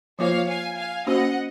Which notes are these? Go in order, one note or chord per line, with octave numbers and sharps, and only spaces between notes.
F3 A#3 F4 C5 C#5 F5
F5 G#5
F5 G#5
A#3 C#4 F#4 C5 D#5 F#5